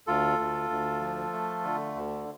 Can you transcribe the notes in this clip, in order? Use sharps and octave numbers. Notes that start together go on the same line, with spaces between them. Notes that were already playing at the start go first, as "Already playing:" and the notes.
D2 F4 A4
D2
D2
F3
A3
D3
D2